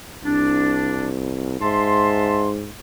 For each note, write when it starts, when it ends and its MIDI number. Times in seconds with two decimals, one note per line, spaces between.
0.25 1.59 36
0.25 1.08 62
1.61 2.72 44
1.61 2.49 76
1.61 2.49 81
1.61 2.49 84